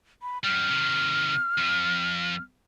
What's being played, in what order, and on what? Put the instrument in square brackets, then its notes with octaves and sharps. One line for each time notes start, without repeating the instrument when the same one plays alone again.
[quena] B5
[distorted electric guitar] F#2 G3 [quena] F6
[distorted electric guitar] C3 D#3
F2 F3